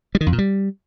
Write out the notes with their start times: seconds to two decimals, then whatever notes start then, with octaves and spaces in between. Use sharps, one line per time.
0.15 G3
0.21 D#3
0.27 F2
0.33 A#2
0.38 G3